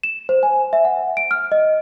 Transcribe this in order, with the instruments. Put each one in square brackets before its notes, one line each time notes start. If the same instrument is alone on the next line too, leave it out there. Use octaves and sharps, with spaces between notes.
[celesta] E7
C5
G#5
E5
F#5
D7
F6
D#5